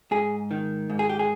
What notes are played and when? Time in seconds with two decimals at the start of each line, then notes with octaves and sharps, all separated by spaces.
0.11 G#2 G#4
0.51 D#3
0.90 G#2
0.99 G#4
1.10 G4
1.19 G#4